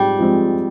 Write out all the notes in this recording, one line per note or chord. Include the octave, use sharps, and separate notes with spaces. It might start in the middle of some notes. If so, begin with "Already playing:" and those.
Already playing: G#2 F3 G3 C4
F3 G#3 C4